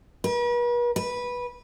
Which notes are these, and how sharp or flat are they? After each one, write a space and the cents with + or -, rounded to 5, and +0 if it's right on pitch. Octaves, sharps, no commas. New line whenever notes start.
B4 -45
B4 -10